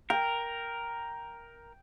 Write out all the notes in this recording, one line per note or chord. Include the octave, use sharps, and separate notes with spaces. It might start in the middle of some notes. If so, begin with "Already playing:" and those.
A#4 G5